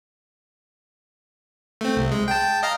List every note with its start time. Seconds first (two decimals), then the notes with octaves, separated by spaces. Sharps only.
1.81 A3 C4
1.96 C2
2.11 G#3
2.28 G5 A5
2.63 D#5 F5 A#5